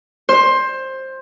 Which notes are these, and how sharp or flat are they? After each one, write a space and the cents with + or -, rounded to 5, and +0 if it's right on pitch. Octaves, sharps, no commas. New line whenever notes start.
C5 +15